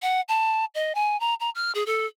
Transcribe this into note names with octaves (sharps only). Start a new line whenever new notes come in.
F#5
A5
D#5
G#5
A#5
A#5
F6
G#4
A4